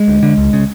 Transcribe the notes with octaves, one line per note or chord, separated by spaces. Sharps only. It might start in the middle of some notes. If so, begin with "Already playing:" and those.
Already playing: G#3
D2
D3
C#2
C#3